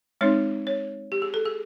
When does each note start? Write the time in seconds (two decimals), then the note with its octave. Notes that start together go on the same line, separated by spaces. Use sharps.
0.21 G#3 C4 D#4 C#5
0.67 C#5
1.12 G4
1.22 G#4
1.34 A4
1.45 G#4